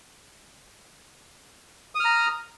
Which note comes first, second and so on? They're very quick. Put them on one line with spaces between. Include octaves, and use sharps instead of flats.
D#6 F6 A#5